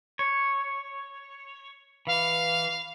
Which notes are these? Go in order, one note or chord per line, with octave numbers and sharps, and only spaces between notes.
C#5
E3 F5